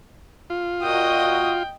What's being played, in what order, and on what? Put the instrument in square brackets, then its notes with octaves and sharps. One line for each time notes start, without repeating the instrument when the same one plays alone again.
[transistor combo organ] F4
[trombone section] A#2 F#4 [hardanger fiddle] D#5 D#6 [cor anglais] G5